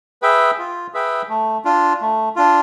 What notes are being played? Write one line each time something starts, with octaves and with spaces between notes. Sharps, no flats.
G#4 B4 E5 G5
F4
G#4 B4 E5 G5
A3
D4 F4
A3
D4 F4